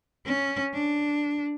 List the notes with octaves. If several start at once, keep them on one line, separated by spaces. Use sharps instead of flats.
C#4
D4